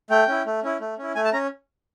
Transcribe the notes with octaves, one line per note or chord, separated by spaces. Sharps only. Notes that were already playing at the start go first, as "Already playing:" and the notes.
A3 G5
C#4 E4
A3
C#4 E4
A3
C#4 E4
A3 G#5
A5
C#4 A#5